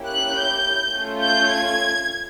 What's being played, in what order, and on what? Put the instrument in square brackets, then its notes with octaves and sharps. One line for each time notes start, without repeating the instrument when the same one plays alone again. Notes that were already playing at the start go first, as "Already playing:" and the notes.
Already playing: [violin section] A#3 C#4 E4 G4
F#6
G6
A3 C#4 F4
G6
G#6